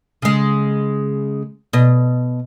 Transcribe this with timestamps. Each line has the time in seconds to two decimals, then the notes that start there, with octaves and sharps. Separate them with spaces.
0.22 C#3 G#3
1.73 B2 D#5